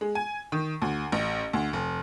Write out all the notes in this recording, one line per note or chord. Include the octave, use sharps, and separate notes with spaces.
G#3
G#5
D#3
D2
A1
D2
F1